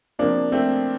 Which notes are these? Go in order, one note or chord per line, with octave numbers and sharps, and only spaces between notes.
C3 F3 A#3 D4
A3 C4